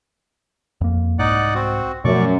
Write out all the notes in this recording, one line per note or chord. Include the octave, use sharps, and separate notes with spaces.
F2 A#3
C2 G#2 D#4 D5 F#5
C4 F#4
F#2 B2 F3 A3 D5 C#6